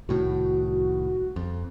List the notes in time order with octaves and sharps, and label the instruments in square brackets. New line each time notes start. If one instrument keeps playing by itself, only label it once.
[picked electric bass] C2 A2 D#3 [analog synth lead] F#4
[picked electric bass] F2